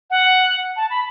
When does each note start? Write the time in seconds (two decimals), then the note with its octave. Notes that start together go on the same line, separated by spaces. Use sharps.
0.10 F#5
0.76 A5
0.90 B5